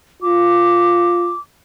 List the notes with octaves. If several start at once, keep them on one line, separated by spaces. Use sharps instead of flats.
F4 D6